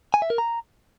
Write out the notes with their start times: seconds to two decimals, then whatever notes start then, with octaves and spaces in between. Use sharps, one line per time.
0.14 G#5
0.22 E5
0.30 A#4
0.38 A#5